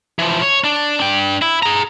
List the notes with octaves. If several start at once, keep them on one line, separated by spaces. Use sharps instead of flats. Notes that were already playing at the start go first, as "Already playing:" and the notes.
E3 F3
C#5
D4
D4 G5
E4
G#4 A#5